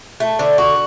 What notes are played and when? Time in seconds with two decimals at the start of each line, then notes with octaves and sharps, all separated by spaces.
0.20 A3
0.39 D3
0.58 F#4